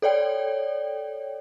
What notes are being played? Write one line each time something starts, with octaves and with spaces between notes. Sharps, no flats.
A4 C#5 D5 G5